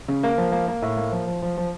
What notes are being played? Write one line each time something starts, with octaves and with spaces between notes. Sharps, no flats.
C#3
A#3
F3
A#3
A#3
A2
A#3
F3
F3
F3
F3